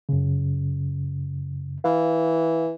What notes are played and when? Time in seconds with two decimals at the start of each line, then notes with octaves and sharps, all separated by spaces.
0.09 F#2 C#3
1.84 E3 F5